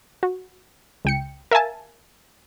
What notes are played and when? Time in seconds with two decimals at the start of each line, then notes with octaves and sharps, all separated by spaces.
0.23 F#4
1.05 C#2 G5 C#7
1.51 A#4 E5 F5 G#5 A5